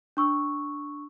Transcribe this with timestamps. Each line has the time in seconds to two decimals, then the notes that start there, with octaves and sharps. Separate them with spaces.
0.17 D4 C#6 E6